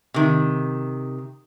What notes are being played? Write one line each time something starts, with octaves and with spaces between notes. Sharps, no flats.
C3 D#3